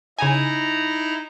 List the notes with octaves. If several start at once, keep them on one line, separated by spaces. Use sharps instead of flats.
C#3 D#4 E4 G#5 A#5